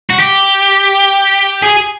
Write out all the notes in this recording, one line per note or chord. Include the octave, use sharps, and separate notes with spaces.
F#4
G4
G#4